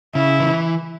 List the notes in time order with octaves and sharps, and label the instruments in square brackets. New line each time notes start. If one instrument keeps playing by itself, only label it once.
[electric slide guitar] C#3 [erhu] E4
[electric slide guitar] E3